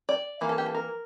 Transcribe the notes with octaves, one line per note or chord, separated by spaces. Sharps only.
D5
E3 A#3
A4
G4
A4
A#4